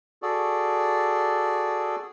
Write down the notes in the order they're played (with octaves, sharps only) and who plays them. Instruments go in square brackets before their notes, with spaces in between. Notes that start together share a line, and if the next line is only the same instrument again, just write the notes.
[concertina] F#4 G#4 A4 D5